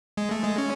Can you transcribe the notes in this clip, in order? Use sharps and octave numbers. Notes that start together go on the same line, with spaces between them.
G#3
A3
G#3
C#4